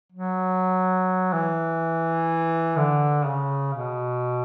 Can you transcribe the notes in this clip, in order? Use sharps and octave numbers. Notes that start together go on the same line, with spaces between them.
F#3
E3
D3
C#3
B2